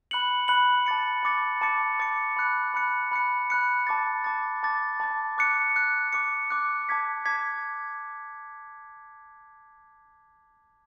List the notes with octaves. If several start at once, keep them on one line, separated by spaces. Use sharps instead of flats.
B5 F#6 C#7 F#7
B5 F#6 C#7 F#7
A5 D6 A6 C#7
A5 D6 A6 C#7
A5 D6 A6 C#7
A5 D6 A6 C#7
B5 F#6 C#7
B5 F#6 C#7
B5 F#6 C#7
B5 F#6 C#7
A5 D6 A6
A5 D6 A6
A5 D6 A6
A5 D6 A6
D6 F#6 C#7
D6 F#6 C#7
D6 F#6 C#7
D6 F#6 C#7
A5 D6 G#6 B6
A5 D6 G#6 B6